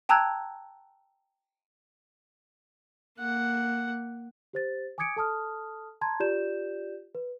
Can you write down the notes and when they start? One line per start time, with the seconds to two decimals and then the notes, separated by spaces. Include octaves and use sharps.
0.09 G5 A5 A#5 E6 F#6 G#6
3.19 A#3 F#5
4.53 G4 C5 A6
4.98 G#5 D6 D#6 G#6 C#7 D7
5.17 A4 A5 D#6 F6
6.01 A5 A#5 C6 G#6
6.20 F4 G4 D5 G6 E7
7.15 B4